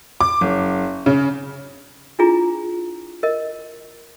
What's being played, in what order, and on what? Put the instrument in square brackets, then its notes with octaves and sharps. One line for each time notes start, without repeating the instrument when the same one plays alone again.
[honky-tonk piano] D6
F#1
C#3
[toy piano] D4 E4 F4 G#4 A#5
A#4 D#5